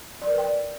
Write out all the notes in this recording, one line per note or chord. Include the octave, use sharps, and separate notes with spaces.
D5
A#4
B4
G5
D5